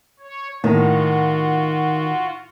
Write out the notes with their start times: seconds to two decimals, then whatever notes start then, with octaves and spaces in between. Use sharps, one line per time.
0.19 C#5
0.64 A2 D#3 F4 F#4